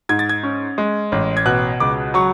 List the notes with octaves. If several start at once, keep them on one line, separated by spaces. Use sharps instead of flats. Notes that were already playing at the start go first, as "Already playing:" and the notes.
G#2 G#6
A6
G#6
C#4
G#3
A1
G#6
B2 F#6
C#2 D6
F#3 C#6